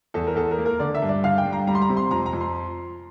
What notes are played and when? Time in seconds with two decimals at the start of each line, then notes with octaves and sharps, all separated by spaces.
0.14 E2 A4
0.27 A#4
0.36 E2 A4
0.51 A#4
0.58 A#3
0.66 A#4
0.80 D3 D5
0.95 E5
1.02 G2
1.09 D5
1.23 D3 F5
1.38 G5
1.46 G2
1.53 A#5
1.67 G3 A#5
1.75 C6
1.82 A#5
1.89 C3
1.97 C6
2.11 F2 A#5
2.26 A#5
2.33 F2
2.41 C6